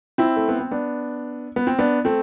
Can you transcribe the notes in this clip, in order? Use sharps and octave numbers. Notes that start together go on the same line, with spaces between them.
C4 E4
A3
B3
C4
B3 D4
B3
C4
B3 D4
A3 C4